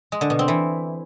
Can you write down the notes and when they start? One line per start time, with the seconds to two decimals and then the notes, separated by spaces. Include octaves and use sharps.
0.12 G#3
0.21 D3
0.30 B2
0.39 C4
0.48 E3